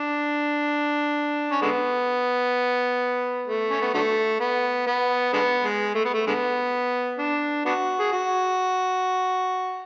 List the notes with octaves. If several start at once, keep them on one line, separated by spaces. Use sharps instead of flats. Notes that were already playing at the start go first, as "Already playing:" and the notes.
Already playing: D4
C#4
D3 G#3 B3
A3
C#4
B3
D3 F#3 A3
B3
B3
D3 G#3 B3
G#3
A3
B3
A3
D3 G#3 B3
D4
B3 D4 F#4
G#4
F#4